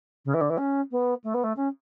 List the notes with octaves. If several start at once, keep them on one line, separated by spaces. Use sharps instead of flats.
C#3
E3
D3
E3
C#4
B3
A3
B3
A3
C#4